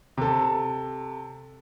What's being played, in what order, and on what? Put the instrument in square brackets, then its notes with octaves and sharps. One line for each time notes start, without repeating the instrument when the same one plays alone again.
[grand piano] C3 A4